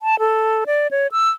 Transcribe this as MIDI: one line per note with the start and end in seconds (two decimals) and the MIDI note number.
0.01 0.19 81
0.19 0.64 69
0.66 0.87 74
0.91 1.07 73
1.12 1.30 88